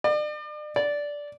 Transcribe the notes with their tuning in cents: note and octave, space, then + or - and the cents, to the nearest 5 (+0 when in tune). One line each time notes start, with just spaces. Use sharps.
D5 +40
D5 -10